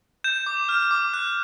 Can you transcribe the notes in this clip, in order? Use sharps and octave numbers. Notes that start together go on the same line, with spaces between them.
G6 E7
D6
F6
D6
F#6